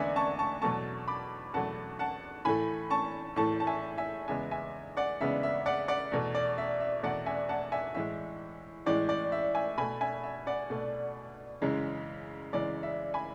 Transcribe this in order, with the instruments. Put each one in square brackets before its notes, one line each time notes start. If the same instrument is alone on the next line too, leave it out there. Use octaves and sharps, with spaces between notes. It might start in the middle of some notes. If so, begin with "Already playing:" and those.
Already playing: [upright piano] E2 D3 G#3 B3 D5 E5 F#5 G#5
A5 C#6
A5 C#6
E2 B2 F#3 A3 A5 C#6
B5 D6
E2 B2 F#3 A3 F#5 A5
F#5 A5
A2 E3 A3 G#5 B5
A5 C#6
A2 E3 A3 A5 C#6
A5
E5 G#5
E5 G#5
E2 C#3 G#3 B3 E5 G#5
E5 G#5
D5 F#5
E2 C#3 G#3 B3 E5
E5
D5 F#5
D5 F#5
E2 B2 A3
D5
E5
E5
E2 B2 A3 D5 F#5
E5 G#5
F#5 A5
E5 G#5
A2 E3 G#3 E5
A2 E3 G#3 D5
D5
E5
E5 G#5
B2 A3 G#5 B5
E5 G#5
E5
D5 F#5
B2 A3
F#2 C#3 E3 G#3
F#2 C#3 E3 G#3 D5
E5
G#5 B5